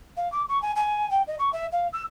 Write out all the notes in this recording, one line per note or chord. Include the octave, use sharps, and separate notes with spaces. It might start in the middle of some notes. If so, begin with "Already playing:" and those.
F5
D6
C#6
G#5
G#5
G5
D#5
C#6
E5
F5
E6